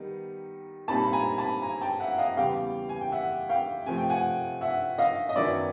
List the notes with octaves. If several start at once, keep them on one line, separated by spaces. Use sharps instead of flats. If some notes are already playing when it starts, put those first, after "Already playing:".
Already playing: D#3 G3 B3 D#4
A#2 G3 C4 D#4 A5 B5
B5
G#5 A#5
A5 B5
G#5 A#5
G5 A5
E5 F#5
D#5 F5
E2 C#3 E3 G3 B3 F5 G5
G#5
G5
E5 F#5
F5 G5
C3 F3 A3 G#5
G5
F#5 G#5
E5 F#5
D#5 F5
D#5
F#2 D#3 F#3 B3 D5 E5